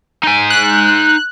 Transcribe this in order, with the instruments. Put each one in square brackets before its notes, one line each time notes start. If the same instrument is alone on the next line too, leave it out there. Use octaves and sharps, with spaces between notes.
[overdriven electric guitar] D#4 G#5
[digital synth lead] F#6